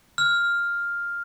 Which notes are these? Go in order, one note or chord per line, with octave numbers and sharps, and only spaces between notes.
F6